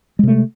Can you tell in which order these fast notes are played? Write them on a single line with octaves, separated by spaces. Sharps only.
G#3 C3 A3